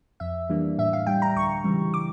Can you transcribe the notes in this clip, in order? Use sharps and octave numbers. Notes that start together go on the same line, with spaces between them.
F2 E5
E3 G3 A#3 D4
A2 E5
F5
G3 D4 G5
A#5
D2 C#6
C#3 E3 G3
D6